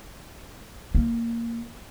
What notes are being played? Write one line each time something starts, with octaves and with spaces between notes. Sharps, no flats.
A#3